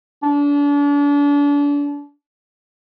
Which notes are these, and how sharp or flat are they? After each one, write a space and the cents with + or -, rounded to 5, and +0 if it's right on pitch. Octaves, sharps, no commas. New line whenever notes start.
D4 -35